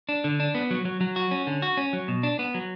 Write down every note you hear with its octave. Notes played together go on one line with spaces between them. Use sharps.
D4
D3
D4
B3
F#3
F#3
F#3
F#4
C#4
D3
F#4
C#4
F#3
B2
D4
B3
F#3